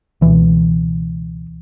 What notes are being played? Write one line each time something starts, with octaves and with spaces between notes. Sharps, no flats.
C#2 B2 E3